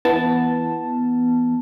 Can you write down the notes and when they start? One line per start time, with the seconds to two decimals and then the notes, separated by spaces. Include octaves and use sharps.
0.05 E3 B3 A5